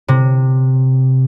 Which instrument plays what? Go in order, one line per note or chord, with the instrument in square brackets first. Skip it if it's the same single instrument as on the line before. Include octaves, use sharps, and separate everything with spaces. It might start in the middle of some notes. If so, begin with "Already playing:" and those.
[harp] C3